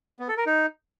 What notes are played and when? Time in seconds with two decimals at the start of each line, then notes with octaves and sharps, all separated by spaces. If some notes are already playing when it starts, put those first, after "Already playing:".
0.19 B3
0.28 A4
0.37 A#4
0.46 D#4